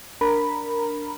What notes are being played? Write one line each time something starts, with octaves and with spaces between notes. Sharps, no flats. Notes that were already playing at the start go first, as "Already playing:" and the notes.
D4 A#4 A#5 B5